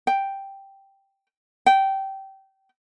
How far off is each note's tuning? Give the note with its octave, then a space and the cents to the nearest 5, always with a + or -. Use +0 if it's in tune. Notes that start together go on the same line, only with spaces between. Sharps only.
G5 +0
G5 -20